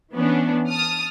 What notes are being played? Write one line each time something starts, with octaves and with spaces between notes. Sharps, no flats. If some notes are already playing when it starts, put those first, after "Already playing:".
E3 B3 C#4 D4
A5 D#6 F6